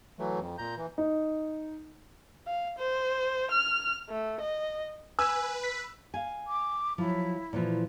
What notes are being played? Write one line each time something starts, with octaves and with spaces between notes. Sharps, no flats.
E3 F#3 A3
F2
A#2 A#5 G6
E3
D#4
F5
C5
F6
A3
D#5
B4 G#5 E6
B6
F5 G#5
D6
F3 F#3 E4
A#2 E3 F3